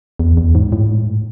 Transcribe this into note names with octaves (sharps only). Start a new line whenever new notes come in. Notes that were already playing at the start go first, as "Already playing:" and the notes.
E2
E2
G#2
A2
G#2
A2